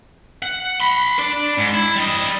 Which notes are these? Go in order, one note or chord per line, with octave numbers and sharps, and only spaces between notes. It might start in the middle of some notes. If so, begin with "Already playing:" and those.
F#5
B5 C6
D4 D5
G#2
E4
G3 D#5